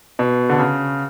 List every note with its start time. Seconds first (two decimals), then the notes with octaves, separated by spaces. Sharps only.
0.19 B2
0.49 D3
0.58 C#3